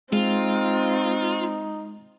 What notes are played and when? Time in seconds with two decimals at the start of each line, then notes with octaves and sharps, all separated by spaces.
0.13 G#3 C4 D#4 F4